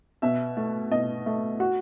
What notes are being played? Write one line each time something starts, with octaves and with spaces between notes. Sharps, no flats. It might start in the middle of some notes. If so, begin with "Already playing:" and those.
B2 E5
A3
B2 D#5
A3
F#4